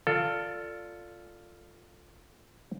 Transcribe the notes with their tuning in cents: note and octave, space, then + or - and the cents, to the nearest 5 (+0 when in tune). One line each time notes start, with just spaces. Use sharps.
F4 +0 A4 +20 D5 +0